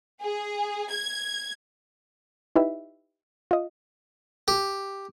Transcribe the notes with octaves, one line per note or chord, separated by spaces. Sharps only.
G#4
G#6
D#4 E4 G4 B4 E5
F4 D#5
G4